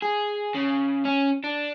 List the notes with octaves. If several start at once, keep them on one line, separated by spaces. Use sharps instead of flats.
G#4
C#3
C#4
D4